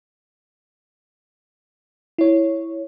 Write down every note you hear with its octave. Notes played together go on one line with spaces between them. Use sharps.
E4 C#5